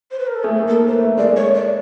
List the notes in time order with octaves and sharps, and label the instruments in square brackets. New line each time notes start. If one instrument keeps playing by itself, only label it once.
[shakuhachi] C5
B4
A#4
A4
[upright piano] A3 [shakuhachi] G#4
[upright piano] A#3
[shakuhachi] A4
[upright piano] A#3
[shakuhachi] C5
B4
[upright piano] A3
[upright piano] G#3 [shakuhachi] D5
[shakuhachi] C#5
D5